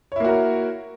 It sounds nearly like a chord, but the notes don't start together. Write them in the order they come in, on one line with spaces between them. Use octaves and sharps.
C#5 E4 A#3 F#4 A#4